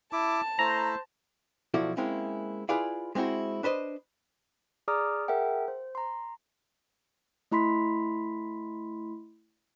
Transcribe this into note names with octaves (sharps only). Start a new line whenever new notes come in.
E4 A5 D6
A3 E4 C5 A#5
B1 F3 E4 F#4 A4 D5
G#3 A#3 C4 C#4 E4
E4 F4 G#4 B4 D5 F5
G#3 C4 C#4 E4 F#4
D4 B4 C5 D#5
G#4 D5 A#5 D6 D#6 F6
G#4 A#4 E5 F#5 G5
C5
A#5 C6
A3 E4 B5 C6 B6